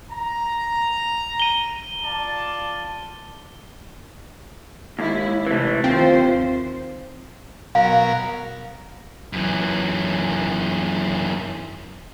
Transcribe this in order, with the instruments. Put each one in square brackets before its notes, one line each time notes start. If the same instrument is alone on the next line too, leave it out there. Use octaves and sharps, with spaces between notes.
[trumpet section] A#5
[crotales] D#7 G7
[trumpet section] F4 D5 A5
[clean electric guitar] D#2 [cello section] G#3 E4
[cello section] C3 [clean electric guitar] E3 A3
[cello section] D#2 C5 [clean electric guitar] F3 [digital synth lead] C4
[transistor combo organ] B2 F#3 A#4 [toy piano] F5
[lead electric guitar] F#2 E3